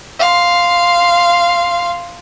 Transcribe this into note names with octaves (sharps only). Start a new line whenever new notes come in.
F5 C6